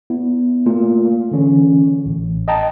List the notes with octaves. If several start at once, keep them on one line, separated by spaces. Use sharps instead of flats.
B3 E4
A3 A#3 F4
D3 E3 C#4
A1
D#5 G5 A5 A#5